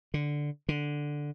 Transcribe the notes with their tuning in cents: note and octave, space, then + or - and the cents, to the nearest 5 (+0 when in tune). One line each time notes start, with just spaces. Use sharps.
D3 +0
D3 +0